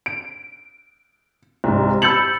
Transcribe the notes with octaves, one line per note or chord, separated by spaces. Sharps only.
D7
C2 G#2
B5 E6 G6 A6 C#7 F#7